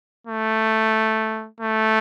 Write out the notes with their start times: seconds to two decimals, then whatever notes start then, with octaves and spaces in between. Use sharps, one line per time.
0.27 A3
1.60 A3